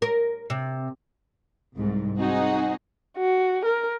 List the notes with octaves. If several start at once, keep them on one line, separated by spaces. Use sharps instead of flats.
A#4
C3
C2 G#2
C4 D#4 F#4 G#4
F#4
A#4